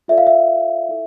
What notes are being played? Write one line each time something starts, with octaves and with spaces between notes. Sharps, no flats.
F4 A4 D5 E5
F5
E5
E4 A4